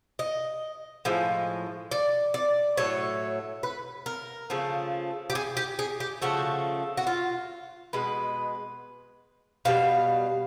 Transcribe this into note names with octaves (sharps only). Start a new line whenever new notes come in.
D#5
A2 F3 G#3
D5
D5
A2 F#3 A3 C#5
B4
A#4
C#3 F3 A3
G4
G#4
G4
G#4
G4
C#3 F3 A3 F#4
F#4
F4
B2 G#3 B4
B2 G3 F5